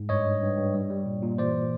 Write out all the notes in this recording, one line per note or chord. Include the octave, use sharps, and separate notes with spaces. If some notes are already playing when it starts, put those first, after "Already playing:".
Already playing: G#2
G2 C#5 D#5
G2
G2
G2
G3
G3
A#2
A#2
E3 C5 D5